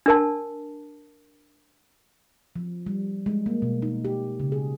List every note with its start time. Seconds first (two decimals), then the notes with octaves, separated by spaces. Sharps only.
0.06 D4 A#4 A5
2.56 F3
2.86 G3
3.26 G#3
3.46 A#3
3.62 B2
3.82 D#4
4.05 G4
4.40 C#3
4.52 G#4